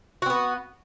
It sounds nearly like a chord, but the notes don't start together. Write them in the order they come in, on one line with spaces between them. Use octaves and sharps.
F#4 C4 B3